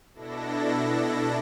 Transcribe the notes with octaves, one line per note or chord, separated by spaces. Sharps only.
B2 D4 E4 A4 A#6